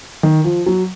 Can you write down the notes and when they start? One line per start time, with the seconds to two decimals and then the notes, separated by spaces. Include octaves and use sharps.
0.23 D#3
0.44 F3
0.66 F#3